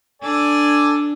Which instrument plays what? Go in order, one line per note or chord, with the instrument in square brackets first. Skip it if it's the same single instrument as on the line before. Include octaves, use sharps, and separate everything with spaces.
[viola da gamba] D4 [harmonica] A4 D5 G#5